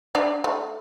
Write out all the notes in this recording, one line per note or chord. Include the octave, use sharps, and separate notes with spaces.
D4 D5
A3